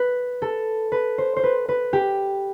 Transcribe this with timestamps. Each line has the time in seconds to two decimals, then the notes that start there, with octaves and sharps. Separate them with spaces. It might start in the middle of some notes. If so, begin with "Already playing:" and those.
Already playing: B4
0.42 A4
0.92 B4
1.18 C5
1.36 C5
1.43 B4
1.69 B4
1.93 G4